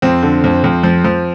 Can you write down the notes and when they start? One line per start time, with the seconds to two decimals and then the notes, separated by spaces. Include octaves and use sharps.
0.02 F2 C4
0.22 D3
0.44 F2
0.64 F2
0.83 F3
1.04 F3